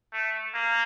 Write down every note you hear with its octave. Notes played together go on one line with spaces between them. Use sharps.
A3
A#3